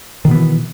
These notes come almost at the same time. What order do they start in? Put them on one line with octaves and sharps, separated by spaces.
D#3 B2 B3 E3